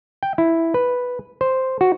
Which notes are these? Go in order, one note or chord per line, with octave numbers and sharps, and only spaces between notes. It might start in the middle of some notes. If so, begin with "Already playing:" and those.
G5
E4
B4
C5
F#4